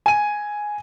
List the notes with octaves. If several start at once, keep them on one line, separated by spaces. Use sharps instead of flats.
G#5 D#7